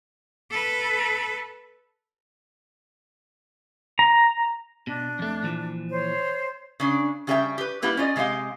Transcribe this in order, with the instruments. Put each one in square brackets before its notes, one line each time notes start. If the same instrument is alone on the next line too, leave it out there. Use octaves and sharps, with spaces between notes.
[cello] A4 B4
[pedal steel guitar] A#5
[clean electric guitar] B2 [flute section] D4
[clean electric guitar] F2 A3
A#2 E3 F3
[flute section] C5 C#5
[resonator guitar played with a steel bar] C#3 D4
C#3 G3 F#4 G#4 E5 G5
G4 B4
G3 A#3 B3 E4 G4
C#4 F4 D5 D#5
C3 G#3 G4 D#5 F5